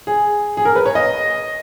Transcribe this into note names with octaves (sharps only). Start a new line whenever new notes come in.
G#4
G#4
A#4
B4
C#5
D#5